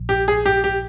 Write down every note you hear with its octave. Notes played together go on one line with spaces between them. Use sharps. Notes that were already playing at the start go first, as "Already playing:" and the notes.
Already playing: A#1
G4
G#4
G4
G4